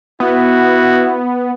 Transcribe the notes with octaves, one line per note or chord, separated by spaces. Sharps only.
B3 E4 F#4